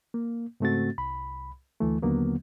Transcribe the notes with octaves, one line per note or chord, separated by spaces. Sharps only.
A#3
G#2 C#3 A3 C4 F#4 A6
C2 B5
D2 E3 A3
D#2 D3 F#3 A#3 B3